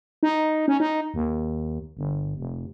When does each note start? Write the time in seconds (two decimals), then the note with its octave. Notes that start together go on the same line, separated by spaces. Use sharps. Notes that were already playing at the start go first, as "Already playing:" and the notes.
0.23 D#4
0.68 C#4
0.80 D#4
1.14 D#2
1.97 G1
2.38 F1